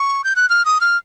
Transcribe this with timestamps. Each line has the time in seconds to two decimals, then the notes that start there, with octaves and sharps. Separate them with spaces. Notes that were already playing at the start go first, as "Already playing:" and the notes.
Already playing: C#6
0.24 G6
0.36 F#6
0.49 F6
0.65 D#6
0.81 F6